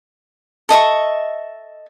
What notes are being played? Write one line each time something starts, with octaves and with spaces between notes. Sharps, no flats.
A4 D#5 E5 C#6